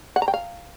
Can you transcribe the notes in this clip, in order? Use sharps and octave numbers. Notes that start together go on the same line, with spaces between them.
F#5
A#5
G5
F5